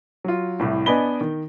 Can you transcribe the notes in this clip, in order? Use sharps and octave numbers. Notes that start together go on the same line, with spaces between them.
F#3 F4
C2 A2
B3 D4 D#5 G#5 B5 G7
D#3